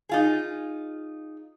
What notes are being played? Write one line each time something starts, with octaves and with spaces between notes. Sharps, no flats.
D#4 F4 G#4